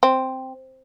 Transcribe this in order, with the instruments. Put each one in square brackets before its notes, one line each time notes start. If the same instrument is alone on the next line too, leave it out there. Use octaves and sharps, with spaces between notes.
[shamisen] C4